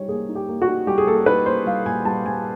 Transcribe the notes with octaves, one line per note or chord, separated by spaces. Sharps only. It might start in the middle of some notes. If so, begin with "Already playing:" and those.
Already playing: G3 D#4 C#5
A#3 G#4
D#4
G4
A#3
F#4
D#4
G3 G4
G#4
A#3 A4
D#4 B4
A#3 C5
G3 F5
A#2 G#5
G3 A5
G3 G#5